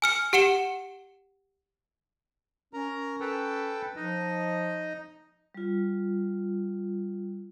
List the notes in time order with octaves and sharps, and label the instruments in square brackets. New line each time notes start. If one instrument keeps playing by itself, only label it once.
[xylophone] G#5 F6 C#7
G4 F#5 C#7 E7 G7
[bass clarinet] C#4 [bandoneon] A#4 A#5
[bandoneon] A4 B4 G5
[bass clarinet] F3 [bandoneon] D#4 D#5
[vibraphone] G3 F4